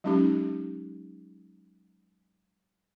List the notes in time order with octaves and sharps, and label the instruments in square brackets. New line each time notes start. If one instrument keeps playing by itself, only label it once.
[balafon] F#3 G#3 C#4 D#4 G4